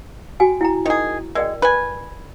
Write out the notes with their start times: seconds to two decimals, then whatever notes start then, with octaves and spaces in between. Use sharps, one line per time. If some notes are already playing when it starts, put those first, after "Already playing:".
0.40 F#4 G5 G#5
0.61 E4 G5 A#5
0.86 D#3 G#4
1.35 G#3 A#4 D5 G5
1.62 B4 G#5